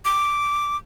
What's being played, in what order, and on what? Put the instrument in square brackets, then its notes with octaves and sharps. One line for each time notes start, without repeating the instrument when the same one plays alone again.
[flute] D6